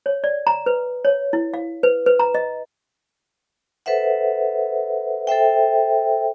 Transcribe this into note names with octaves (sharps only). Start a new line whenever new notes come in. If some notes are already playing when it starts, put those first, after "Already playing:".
C#5
D5
A#5
B4
C#5
E4
F5
B4
B4
A#5
D#5
A4 B4 C5 E5 F#5
A4 C5 E5 G5